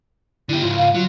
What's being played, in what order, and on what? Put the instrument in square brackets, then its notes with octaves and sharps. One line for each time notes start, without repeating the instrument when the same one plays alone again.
[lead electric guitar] D3 G4 [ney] E4
[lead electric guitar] C#2 G#2 [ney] F4
[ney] F5
[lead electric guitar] F#3 [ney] F4